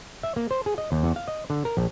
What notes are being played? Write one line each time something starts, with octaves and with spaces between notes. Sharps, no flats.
E5
A#3
C5
G#4
D#5
D#2
E2
F5
D#5
D3
A#4
A#1